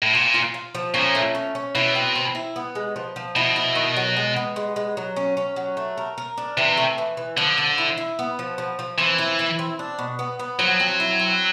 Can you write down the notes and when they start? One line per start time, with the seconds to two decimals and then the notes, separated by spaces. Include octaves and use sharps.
0.02 A2
0.13 A#2 F4
0.34 F4
0.54 F4
0.75 F3
0.94 A#2 C#4
1.15 A3
1.35 C#4
1.55 C#4
1.75 B2 E4
1.95 C4
2.16 C4
2.35 E4
2.56 B3
2.75 G#3
2.96 F3
3.16 F3
3.35 B2 E4
3.56 E4
3.75 D#3
3.96 F#3
4.17 G#3
4.36 B3
4.56 G#3
4.76 G#3
4.97 F#3
5.16 C#4
5.37 C#4
5.56 F#3
5.77 A3
5.97 A#4
6.18 A#4
6.38 D4
6.57 C3 E3
6.77 A3
6.98 E3
7.17 E3
7.37 D3 F3
7.58 F3
7.78 E4
7.97 E4
8.19 B3
8.39 F3
8.58 F3
8.79 F3
8.98 E3 C4
9.18 E4
9.39 E4
9.59 C4
9.79 D4
9.99 B2
10.19 B3
10.39 B3
10.59 F3 F#3
10.80 C4
11.00 E4
11.19 C4